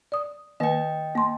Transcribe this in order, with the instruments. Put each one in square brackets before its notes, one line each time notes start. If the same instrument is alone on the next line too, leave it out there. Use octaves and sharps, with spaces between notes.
[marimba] D5 D#6
[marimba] D#3 A#3 B4 [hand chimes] D#5 G5
[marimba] A#3 C6